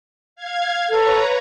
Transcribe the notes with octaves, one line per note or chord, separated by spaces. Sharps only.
F5 G#6
A4 B4 C#5 A#5